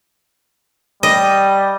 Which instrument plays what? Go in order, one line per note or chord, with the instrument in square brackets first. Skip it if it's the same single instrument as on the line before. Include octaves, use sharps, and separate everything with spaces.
[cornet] G3 [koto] D#5